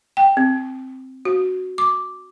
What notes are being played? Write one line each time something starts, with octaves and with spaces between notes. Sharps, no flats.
G5
C4
F#4
D6